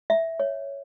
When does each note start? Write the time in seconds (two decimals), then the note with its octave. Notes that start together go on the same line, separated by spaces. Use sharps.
0.10 E5
0.40 C#5